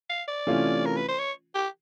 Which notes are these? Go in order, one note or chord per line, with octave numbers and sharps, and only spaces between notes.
F5
D5
C3 E3 A3 C#4 F4
A#4
B4
C5
C#5
G4